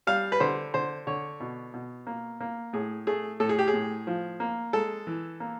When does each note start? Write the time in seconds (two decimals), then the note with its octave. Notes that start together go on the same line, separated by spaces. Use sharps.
0.07 G3 F5
0.32 B4
0.40 D3 C5
0.74 D3 C5
1.07 D3 C#5
1.40 B2
1.74 B2
2.07 A#3
2.41 A#3
2.73 A2 G#4
3.07 A3 G#4
3.40 A2 A4
3.49 G#4
3.59 G4
3.68 G#4
3.73 A2
4.07 F3
4.40 A#3
4.73 G#3 A4
5.07 E3
5.40 A#3